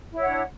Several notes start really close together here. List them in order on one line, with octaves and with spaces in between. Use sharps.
E4 C#5 F#5 D4